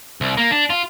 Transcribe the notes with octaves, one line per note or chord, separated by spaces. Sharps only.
C2
A#3
D4
F4